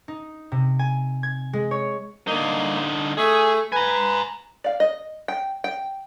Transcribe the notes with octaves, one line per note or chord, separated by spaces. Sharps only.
D#4
C3
G#5
G#6
G#3
C#5
D3 A#3 D#4
A3 G#4
B4 G#5 A#5
D5 F5
D#5
G5
G5